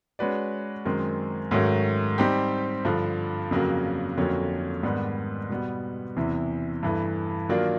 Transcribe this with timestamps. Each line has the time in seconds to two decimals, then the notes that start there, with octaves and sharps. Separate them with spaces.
0.19 G#3 C#4 F#4 B4 D5
0.85 F#2 D#3 G#3 C4
1.51 G#2 D#3 F#3 A3 C#4
2.18 G3 C4 D#4 G4
2.85 G2 D3 F3
3.51 F2 C#3 F#3 A#3
4.17 F2 D3 F#3 A#3 C#4
4.83 G#2 D#3 G3 B3 D4
5.50 B2 G3 B3
6.17 E2 C3 E3
6.83 G2 E3 A3
7.49 D#3 F#3 A#3 D4 F4